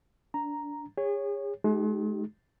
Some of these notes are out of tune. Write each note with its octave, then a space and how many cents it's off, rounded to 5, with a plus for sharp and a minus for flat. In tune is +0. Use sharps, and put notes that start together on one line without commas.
D4 -20 A#5 +0
G#4 -40 C#5 +0
G#3 +40 D#4 +0 G4 -20